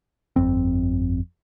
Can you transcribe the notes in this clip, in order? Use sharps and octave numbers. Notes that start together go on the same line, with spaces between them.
G1 F2 C4